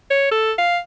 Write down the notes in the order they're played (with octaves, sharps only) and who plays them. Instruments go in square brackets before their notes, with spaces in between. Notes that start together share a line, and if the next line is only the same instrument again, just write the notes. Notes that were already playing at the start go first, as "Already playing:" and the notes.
[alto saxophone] C#5
A4
F5